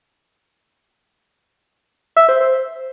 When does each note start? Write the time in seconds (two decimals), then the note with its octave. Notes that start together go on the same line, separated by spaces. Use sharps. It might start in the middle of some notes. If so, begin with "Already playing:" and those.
2.17 E5
2.28 C5
2.40 C5